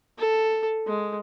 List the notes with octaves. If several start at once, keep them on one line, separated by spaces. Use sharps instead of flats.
A4
G#3